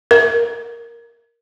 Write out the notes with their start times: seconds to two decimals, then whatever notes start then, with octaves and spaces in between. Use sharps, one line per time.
0.11 A#4